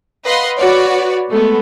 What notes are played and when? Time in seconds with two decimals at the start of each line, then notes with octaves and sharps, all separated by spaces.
0.25 B4 D#5 F5 F#5 C6
0.58 F#4 B4 C#5 D5
1.30 G#3 A3 B3